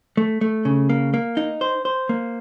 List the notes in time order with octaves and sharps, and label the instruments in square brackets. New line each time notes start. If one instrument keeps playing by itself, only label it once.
[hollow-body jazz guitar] A3
A3
C#3
A#3
A#3
D#4
C5
C5
A#3